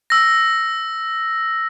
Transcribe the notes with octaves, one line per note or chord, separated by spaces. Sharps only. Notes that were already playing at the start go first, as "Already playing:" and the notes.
E6 A#6